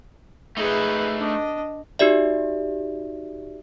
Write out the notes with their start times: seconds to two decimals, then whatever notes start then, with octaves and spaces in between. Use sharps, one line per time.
0.57 A3 D#4 G#4 B4
1.17 D4 D#5
1.99 D#4 F#4 G4 D5 E5